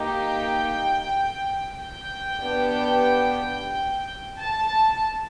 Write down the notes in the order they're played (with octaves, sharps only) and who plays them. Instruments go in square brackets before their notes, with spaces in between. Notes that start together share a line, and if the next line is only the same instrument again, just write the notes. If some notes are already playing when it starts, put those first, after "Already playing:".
Already playing: [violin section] A#3 D#4 G4
G5
G5
B3 D4 G4
A5